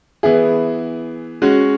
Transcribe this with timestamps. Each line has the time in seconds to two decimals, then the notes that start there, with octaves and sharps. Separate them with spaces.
0.23 E3 B3 E4 G#4
1.42 G#3 C#4 F#4